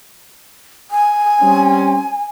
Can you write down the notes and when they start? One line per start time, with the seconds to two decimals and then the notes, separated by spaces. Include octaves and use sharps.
0.91 G#5
1.41 G3 C4 C#4